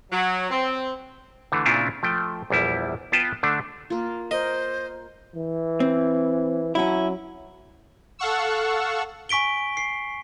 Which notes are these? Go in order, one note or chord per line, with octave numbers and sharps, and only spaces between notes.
F#3
C4
D3 E3 A3
A#2 C#3 C4 D4 E4 F4
F3 A3 G5
A#1 E2 G3 E4
B3 F4 B4 G5 A5
D3 A3 D4
A#3 F4
A#4 C5 D#5
E3
C4
F#3 C#4 E4
A4 F5 F#5 C#6 E6
G#5 C#6 B6 D7 G7
C7